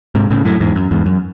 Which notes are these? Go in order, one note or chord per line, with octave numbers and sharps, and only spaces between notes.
G#2 C3
A2 C#3
F#2 A2
E2 G#2
F#2
E2 G#2
F#2